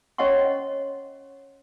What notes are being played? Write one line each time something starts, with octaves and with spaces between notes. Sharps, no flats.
C#4 C#5 D#5 F#5 C6 C#6